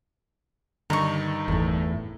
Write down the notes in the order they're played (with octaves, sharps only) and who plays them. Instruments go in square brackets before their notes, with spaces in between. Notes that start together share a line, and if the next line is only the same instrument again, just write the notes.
[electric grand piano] G2 D#3 D#4 [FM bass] D3 [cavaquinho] A#5 C#6
[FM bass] G1 [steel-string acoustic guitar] E2 A2